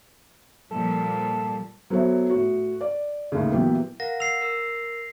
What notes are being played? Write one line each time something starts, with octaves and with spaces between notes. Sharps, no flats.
A#2 F3 G3 A4
F#3 B3 A4 C5 C#5 E5
A2 F#4
D5
D#2 A2 C#3
A#2 E3 F#3 B3 E4 G4
A#4 F5 F#5 A#6
E6 C7 F7
A#4 E6